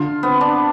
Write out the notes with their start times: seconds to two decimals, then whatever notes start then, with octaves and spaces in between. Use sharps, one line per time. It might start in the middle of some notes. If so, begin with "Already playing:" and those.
Already playing: D3 F4
0.23 B3 C4
0.41 D4